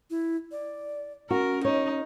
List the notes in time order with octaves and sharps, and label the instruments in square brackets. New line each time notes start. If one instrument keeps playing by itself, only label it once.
[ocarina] E4
D5
[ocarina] C#4 [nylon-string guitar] F#4 [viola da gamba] A#4
[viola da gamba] D#4 [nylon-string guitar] C#5